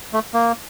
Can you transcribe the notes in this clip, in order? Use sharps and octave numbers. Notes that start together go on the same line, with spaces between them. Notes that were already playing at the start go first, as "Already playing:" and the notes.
A3
A#3